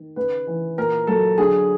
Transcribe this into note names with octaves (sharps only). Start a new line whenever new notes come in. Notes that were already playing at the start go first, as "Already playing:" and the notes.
Already playing: D#3
C#3 B4
E3
A#2 A#4
F#3 A4
D3 G#4